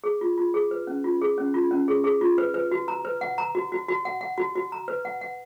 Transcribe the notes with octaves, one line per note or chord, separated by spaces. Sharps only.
G#4
F4
F4
G#4
B4
C#4
F4
G#4
C#4
F4
C#4
G#4
G#4
F4
B4
B4
F#4
A#5
B4
F#5
A#5
F#4
F#4
F#4
F#5
F#5
F#4
F#4
A#5
B4
F#5
F#5